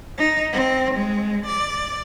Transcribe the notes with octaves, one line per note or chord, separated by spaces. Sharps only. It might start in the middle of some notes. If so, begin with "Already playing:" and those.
D#4
C4
G#3
D5